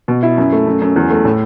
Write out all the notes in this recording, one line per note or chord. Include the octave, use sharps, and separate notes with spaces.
B2
E4
F#2
A3
F#2
F#2
E2
A3
A2